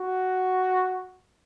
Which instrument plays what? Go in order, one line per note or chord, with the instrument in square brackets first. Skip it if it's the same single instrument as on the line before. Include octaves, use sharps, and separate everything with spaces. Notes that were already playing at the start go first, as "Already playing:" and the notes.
Already playing: [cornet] F#4